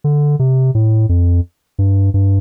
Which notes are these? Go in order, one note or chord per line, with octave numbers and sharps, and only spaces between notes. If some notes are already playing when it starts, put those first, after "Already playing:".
D3
C3
A2
F2
G2
G2